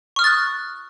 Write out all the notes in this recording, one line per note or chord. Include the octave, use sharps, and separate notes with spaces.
C#6 D#6 F6 F#6 A6